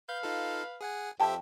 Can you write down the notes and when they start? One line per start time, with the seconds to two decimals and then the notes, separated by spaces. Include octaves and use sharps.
0.09 B4 F5 G6
0.23 D#4 F4 A4
0.81 G#4 F#5 G#5
1.20 F2 G4 C5 E5 G5 A5